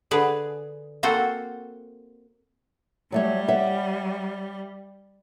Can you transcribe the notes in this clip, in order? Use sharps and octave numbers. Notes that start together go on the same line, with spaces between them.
D3 G#4 B4
A#3 C4 F#4 A4 C5
F#3 G3 A3 C#5
C#5 E5 F#5